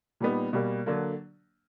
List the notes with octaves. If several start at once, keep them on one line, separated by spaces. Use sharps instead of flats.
A#2 G3 B3 D#4
B2 G3 A#3
D3 F#3 A#3 D4